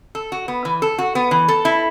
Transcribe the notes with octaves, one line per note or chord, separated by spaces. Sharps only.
A4
F#4
B3
E3
A4
F#4
B3
E3
A4
E4